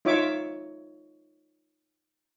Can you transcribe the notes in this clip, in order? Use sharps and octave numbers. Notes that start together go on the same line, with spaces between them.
D#4 F4 C#5 E5 D6